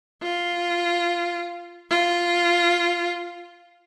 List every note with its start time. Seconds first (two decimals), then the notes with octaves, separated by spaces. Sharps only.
0.22 F4
1.90 F4